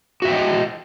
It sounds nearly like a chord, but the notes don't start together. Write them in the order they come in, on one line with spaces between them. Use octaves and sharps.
F#4 E5 G5 D#5